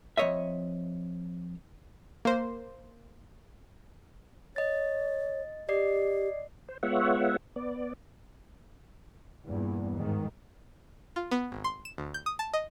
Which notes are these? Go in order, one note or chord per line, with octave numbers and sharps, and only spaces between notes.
F2 E3 C#5 D#5 E5
A#3 C5
C#5 D#5 A6
G4 D5 D#5 C7
C5
G#3 B3 F4 C#5 E5 F#5
B3 D5
E2 G2 A#2
G#2 D#3
F4
B3
G#1
C6
E7
D2
G6
D#6
A5
D#5